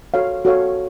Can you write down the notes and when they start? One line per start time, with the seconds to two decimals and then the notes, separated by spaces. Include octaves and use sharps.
0.14 F#4 A4 C#5 F5
0.45 F#4 A4 C#5 F5